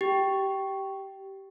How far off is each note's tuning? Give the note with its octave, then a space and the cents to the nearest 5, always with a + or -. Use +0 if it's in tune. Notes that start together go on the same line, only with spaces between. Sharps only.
G4 -15